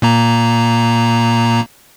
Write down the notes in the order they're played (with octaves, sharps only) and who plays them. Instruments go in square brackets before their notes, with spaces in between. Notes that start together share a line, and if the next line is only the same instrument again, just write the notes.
[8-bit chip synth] A#2 A#3 A#5